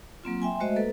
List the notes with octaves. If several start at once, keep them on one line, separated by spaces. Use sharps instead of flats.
F#3 A#3 C4 F4
E5 G5 G#5 C6
G#3 A3 F#4 C5 D#5 E5
A#3 A4 B4